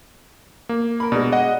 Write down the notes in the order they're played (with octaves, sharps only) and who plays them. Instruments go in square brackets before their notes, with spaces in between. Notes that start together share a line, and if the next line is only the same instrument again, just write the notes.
[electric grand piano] A#3
[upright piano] A#4 B5
[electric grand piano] B2 [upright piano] G#3 D4
[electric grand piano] D#5 F#5